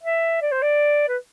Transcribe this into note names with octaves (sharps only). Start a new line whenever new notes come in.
E5
D5
C5
D5
B4